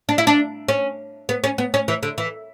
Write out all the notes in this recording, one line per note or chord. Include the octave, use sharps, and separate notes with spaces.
D4
E4
D4
C#4
B3
C#4
B3
C#4
E3
D3
E3